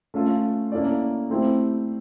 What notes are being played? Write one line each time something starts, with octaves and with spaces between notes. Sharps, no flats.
A3 C#4 F4 A4
A#3 C#4 E4 A4 D5
A3 C4 E4 G4